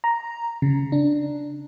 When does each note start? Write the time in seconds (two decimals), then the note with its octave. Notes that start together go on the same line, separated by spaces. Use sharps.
0.04 A#5
0.62 C#3
0.92 D4